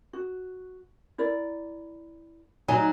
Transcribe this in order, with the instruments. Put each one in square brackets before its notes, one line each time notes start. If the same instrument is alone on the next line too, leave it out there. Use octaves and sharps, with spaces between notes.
[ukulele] F#4
E4 A#4 D5
[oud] F#3 D#4 [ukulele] G#5